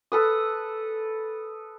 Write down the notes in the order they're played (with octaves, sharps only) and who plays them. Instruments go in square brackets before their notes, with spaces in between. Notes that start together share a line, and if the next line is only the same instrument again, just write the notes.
[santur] A4 B4 D#6